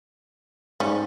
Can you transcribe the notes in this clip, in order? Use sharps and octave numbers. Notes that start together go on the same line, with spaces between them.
G#2 G3 C#4